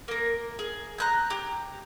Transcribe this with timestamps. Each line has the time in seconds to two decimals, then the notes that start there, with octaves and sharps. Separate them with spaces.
0.08 A#3 A#4
0.59 G#4
0.98 A#5 F#6 G6
1.30 G4